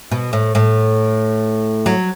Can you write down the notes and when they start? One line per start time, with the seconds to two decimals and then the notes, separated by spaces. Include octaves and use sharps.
0.11 B2
0.33 A2
0.55 A2
1.86 F#3